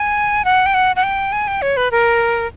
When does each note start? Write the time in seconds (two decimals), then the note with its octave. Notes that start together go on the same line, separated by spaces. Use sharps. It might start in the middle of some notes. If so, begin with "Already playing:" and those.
Already playing: G#5
0.45 F#5
0.66 G5
0.74 F#5
0.96 F#5
1.03 G5
1.32 G#5
1.48 G5
1.62 C#5
1.77 B4
1.91 A#4